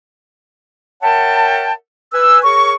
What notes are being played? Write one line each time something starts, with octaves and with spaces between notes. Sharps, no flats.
A#4 C#5 E5 F#5 G5 A5
B4 G#5 E6
G#4 A#4 C#5 C#6